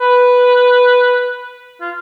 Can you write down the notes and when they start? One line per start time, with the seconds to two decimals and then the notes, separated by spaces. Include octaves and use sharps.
0.01 B4
1.81 F4